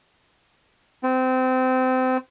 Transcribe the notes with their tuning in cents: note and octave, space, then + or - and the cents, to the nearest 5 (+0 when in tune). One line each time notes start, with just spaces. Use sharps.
C4 -25